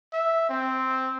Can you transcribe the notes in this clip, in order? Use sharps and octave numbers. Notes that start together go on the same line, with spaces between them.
E5
C4